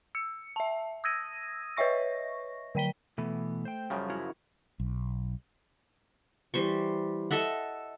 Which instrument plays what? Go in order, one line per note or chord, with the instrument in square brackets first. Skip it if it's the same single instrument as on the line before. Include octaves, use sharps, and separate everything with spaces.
[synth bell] E6 C#7
E5 A5
D#6 E6 G#6 A#6 D#7
B4 C#5 D#5 E5 C#6 A#6
D3 F#3 G5 B6 G7
[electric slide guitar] B2 E3 B3 [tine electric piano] A3
[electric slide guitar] C5 G5
[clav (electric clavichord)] F#2 C#3 F3 [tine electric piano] G3
[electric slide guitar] E4 F#4 A#4
[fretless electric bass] B1
[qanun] E3 G3 C5 C#6
A4 D#5 E5 F#5